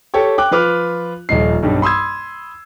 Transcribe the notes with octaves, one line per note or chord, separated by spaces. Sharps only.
G4 A4 C#5 G5 C#6
G5 D6 F#6
F3 F4 B4 D6 F6
D#1 F3 D#4 C7
B1 G2 G3
B5 C6 D#6 E6 G#6